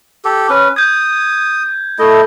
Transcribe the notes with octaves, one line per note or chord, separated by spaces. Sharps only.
G4 A4
C#4 B4
D#6 G6 G#6
A3 E4 A4 D#5